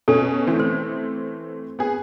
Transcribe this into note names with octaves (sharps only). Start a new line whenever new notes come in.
B2 C#4 A4
E3 A3 C4
C5
B3 G#4